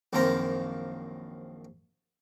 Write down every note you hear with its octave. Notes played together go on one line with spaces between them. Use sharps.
A#1 F#2 D#3 A#3 C4 A#5